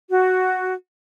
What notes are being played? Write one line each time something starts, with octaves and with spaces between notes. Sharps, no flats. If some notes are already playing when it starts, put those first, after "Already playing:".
F#4